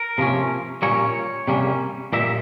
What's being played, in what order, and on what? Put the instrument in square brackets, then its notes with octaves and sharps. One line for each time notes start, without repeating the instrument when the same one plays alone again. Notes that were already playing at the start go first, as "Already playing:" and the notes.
Already playing: [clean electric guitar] A#4
C3 F3 A#3 C#4
A#2 G3 A#3 C#4 C#5
C3 G3 A#3 C#4
A#2 G3 A#3 E5